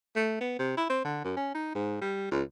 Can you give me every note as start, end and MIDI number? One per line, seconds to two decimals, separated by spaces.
0.16 0.36 57
0.41 0.55 59
0.59 0.73 48
0.77 0.85 64
0.90 1.00 60
1.04 1.20 50
1.24 1.36 42
1.36 1.50 61
1.55 1.74 63
1.75 2.00 44
2.01 2.28 55
2.31 2.42 37